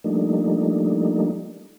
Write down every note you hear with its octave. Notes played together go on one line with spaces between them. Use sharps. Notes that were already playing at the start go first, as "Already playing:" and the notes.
F3 G3 A3 A#3 D4 D#4